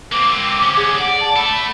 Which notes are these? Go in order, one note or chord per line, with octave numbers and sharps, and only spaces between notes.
A#3 C4 D6
D3 C#4
G#4
D5 F#5
A5
A3 A4 B5